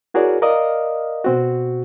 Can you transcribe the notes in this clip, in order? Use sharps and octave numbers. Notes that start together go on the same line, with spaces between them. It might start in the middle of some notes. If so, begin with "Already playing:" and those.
E4 F#4 G#4 A#4 C#5 D5
A#4 D5 D#5 F5 D#6
B2 C4 F#4